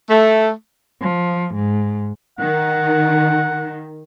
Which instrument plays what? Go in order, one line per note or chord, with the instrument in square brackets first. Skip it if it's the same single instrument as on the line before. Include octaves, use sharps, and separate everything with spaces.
[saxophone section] A3
[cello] F3
G#2
[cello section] D#3 [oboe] F#5